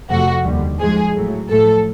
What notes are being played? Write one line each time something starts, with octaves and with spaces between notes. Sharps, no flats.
F2 C3 F3 A3 F#4
D#2 D3 G3
G#2 F3 G#3 G#4
A2 F#3 A3
A2 F3 A3 A4